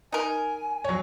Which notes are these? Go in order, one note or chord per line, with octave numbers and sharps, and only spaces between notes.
D#4 A#4 G#5
F#3 C#5